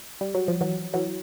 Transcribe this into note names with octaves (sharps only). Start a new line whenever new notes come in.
G3
F#3
F3
E3 F#3
E3 F#3